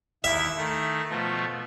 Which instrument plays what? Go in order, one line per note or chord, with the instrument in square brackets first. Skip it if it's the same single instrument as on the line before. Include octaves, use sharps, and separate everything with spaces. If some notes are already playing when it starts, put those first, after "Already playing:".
[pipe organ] D#2 E4 [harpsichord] E5
[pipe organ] D#3 A3
B2 F3 A3